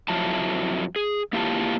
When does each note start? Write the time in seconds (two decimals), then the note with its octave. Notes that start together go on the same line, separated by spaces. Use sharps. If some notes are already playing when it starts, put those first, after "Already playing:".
0.08 F2 F3 F#3 E4 A5
0.96 G#4
1.33 A#3 E4 F4 G4 A5